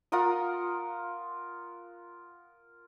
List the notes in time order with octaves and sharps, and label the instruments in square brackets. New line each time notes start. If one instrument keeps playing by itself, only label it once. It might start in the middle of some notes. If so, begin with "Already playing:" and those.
[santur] F4 A#4 F#5 D#6